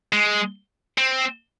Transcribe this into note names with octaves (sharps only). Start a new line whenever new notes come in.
G#3
C4